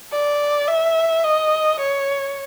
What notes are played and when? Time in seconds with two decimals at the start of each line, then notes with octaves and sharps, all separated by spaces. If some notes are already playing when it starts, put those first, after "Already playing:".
0.12 D5
0.68 E5
1.24 D#5
1.80 C#5